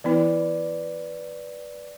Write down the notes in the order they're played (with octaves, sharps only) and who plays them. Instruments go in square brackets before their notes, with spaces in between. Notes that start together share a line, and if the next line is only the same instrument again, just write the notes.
[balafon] E3 B3 E4 [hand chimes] B4 D5